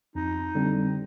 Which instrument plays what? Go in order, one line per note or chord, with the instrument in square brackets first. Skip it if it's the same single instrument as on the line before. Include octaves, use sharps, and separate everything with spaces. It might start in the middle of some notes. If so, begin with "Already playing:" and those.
[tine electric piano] F2 [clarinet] D#4
[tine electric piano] D3 G3 C4